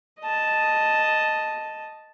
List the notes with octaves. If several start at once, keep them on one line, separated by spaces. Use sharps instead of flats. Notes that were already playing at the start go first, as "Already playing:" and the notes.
D#5 A5